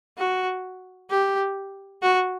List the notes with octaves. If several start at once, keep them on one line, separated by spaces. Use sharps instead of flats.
F#4
G4
F#4